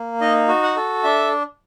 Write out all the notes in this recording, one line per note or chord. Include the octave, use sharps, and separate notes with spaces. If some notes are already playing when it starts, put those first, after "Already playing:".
Already playing: A#3
D#4 D#5
F#4
F#5
A4
D4 E5